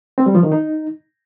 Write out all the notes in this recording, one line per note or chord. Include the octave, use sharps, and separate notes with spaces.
C4
G3
F3
D#3
D#4